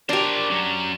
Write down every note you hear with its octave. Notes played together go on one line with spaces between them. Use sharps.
D4 G4 A#4 C5
F#3 C#4